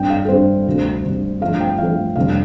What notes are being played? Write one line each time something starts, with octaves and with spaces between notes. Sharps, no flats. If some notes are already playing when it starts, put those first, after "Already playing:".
Already playing: G2 G3 C4 G5
F5
A4
G2 G3 C4 C5
D2 C3 G3
D2 C3 G3
G2 F3 A3 F5
G5
G2 F3 A3 F5
F1 F2 D3 G3 D4 F5